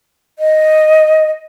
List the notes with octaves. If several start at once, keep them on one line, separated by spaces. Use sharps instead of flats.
D#5